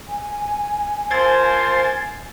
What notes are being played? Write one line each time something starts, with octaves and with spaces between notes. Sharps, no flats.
G#5
F3 A#3 C5 G#6 A6